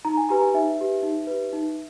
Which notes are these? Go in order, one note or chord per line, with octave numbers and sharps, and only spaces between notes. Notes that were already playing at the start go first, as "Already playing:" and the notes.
D#4 A#5
G#5
G4 B4 A#5
G#5
D#4 E5
G4 B4
D#4
G4 B4
D#4